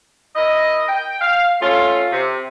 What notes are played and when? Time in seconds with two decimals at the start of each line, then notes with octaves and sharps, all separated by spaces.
0.36 E4 A#4 D#5
0.88 G5
1.21 F5
1.61 A3 C#4 F4
2.11 C3